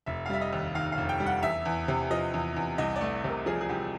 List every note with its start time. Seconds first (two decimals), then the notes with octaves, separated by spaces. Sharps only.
0.06 F1 E5
0.26 F5
0.30 G3 E5
0.41 D#5
0.52 D#2
0.75 D#3 F5
0.92 F5
0.98 F1
1.09 G5
1.20 G3
1.26 F#5
1.42 E2 E5
1.65 E2
1.88 C3
2.11 F3 D#5
2.34 E2
2.56 E2
2.78 C2 D#5
2.96 D5
3.01 A3
3.24 C3 A#4
3.46 F3 G#4
3.61 G#4
3.69 C2 G4